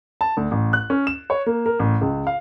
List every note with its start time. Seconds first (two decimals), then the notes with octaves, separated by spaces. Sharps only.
0.21 A5
0.37 D2
0.51 A1
0.73 F#6
0.90 C#4
1.07 E7
1.30 C#5
1.46 A#3
1.66 A#4
1.79 A1
2.01 C#2
2.27 F5